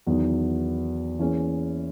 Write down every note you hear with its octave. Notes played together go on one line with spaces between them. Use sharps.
E2 D#3 F#3 B3
E3 A#3 C#4 G#4